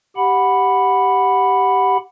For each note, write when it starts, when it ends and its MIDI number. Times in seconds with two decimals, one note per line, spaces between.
0.17 1.97 67
0.17 1.97 78
0.17 1.97 83